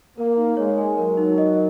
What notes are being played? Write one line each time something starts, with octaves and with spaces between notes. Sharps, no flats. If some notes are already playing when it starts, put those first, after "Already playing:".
A#3 A#4
D#4
G#3 C#5
G#5
F#3 A#4
D#4
D#5